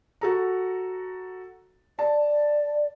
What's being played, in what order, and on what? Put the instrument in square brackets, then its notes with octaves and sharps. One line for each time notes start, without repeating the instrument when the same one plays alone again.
[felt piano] F#4 A4 A#5
[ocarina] D5 [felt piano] A5